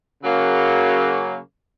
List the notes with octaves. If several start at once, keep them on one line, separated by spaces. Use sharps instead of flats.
C#3 F#3 A#3